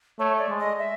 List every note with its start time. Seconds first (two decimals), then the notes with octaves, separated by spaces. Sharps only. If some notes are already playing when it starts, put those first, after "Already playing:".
0.19 A3 C#5
0.38 D5
0.49 G#3
0.59 D#5
0.79 E5